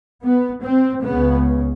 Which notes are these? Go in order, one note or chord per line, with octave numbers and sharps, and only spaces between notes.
B3
C4
C#2 C#3 B3